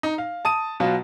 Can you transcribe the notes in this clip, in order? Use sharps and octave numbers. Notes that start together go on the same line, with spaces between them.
D#4
F5
A5 D#6 D#7
B2 F#3 F4